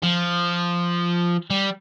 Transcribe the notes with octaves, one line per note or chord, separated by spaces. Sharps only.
F3
G3